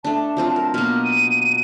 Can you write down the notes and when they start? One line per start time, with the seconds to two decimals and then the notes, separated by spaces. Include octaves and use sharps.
0.05 A3 D4 A5
0.37 F#3 C4 F4
0.56 A#4
0.74 B2 A#3 F6
1.04 D#7